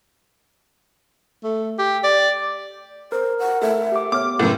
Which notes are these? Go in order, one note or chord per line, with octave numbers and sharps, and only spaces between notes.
A3
G4
D5
A#4 C5
F#5
A3 E5
G4 D6
B3 C#5 D6 F6
F#2 A2 B4